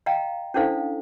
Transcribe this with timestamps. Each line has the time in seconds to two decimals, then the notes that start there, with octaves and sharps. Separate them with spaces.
0.06 D#5 F5 G5 A#5
0.54 C#4 D4 E4 A4 C5 F5